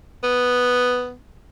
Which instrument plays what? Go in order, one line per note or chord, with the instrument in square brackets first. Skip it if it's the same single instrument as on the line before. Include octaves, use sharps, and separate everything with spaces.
[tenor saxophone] B3